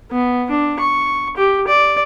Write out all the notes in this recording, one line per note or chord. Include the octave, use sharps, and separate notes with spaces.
B3
D4
C#6
G4
D5